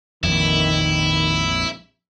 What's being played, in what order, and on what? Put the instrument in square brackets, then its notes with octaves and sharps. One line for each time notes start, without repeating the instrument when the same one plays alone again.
[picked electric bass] A#1 F2 [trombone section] D#3 [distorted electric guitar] E4